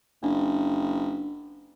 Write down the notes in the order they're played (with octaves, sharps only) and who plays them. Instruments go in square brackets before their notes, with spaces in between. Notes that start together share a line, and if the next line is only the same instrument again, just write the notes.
[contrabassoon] F#1 [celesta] D4